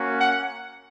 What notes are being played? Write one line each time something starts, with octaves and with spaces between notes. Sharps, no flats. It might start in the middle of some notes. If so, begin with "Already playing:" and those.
Already playing: A#3 C#4 F#4
F#5